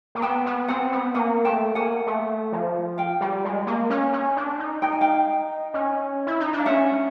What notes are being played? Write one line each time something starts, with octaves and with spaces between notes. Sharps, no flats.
A#3
B3 G5 A5
B3
C4 F#5 G#5
B3
A#3 F#5 G#5
A3 G5 A5
A#3 F#5 G#5
A3
F3
F5 G5
G3
G#3
A#3
C#4
C#4
D4
D#4
D#4 G5
G#5
F5 G5
C#4
E4
D#4
D4
F5
C#4 E5 F#5